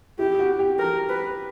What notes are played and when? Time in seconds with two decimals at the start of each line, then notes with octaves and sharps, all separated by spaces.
0.19 E4 G4
0.39 F#4
0.59 G4
0.79 A#4
1.09 B4